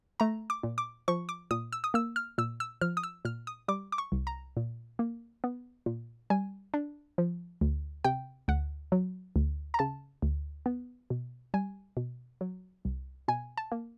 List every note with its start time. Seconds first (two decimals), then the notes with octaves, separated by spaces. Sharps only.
0.20 A3 A#5
0.50 D6
0.63 A#2
0.78 D6
1.08 F3 C#6
1.29 D6
1.51 A#2 D#6
1.72 E6
1.84 D#6
1.94 A#3 E6
2.16 F6
2.38 A#2 E6
2.60 E6
2.81 F3 F6
2.97 D#6
3.03 E6
3.25 A#2 F6
3.47 D#6
3.68 G3 D6
3.92 D6
3.98 C#6
4.12 C2
4.27 A#5
4.57 A#2
4.99 A#3
5.44 B3
5.86 A#2
6.30 G3 G#5
6.74 D4
7.18 F3
7.61 D2
8.04 C3 G5
8.48 D2 F#5
8.92 F#3
9.36 D2
9.74 A#5
9.79 C#3 A5
10.22 D2
10.66 B3
11.10 B2
11.54 G3 G#5
11.97 B2
12.41 F#3
12.85 C2
13.28 B2 G#5
13.57 A5
13.72 A#3